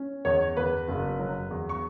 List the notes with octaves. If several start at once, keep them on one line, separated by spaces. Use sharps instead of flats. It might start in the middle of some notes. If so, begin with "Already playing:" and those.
Already playing: C#4
E2 C#5
E2 B4
F#1
F#3
E2
C#6